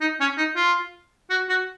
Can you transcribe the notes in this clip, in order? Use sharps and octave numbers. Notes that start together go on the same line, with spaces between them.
D#4
C#4
D#4
F4
F#4
F#4